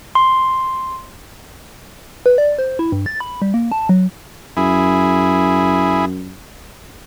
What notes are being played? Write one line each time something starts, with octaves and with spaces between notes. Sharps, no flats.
C6
B4
D5
C5
E4
G2
A6
B5
G3
A#3
A5
F#3
F#2 E4 G#4